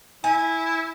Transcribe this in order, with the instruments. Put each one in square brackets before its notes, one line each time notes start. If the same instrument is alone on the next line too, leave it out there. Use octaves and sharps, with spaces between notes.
[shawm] E4 [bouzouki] G#5